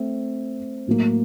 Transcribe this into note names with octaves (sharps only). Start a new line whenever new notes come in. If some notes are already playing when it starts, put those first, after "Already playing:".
Already playing: A3 C4
A2 F#3 A#3